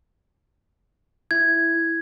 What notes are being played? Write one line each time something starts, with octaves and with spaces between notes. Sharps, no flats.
E4 G#6